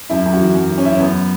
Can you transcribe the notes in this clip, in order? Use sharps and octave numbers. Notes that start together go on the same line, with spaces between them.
F#2 E4
F#2
F#4
E3
F#2
E3
C#4
F#2 E4
C#4
F#2 B3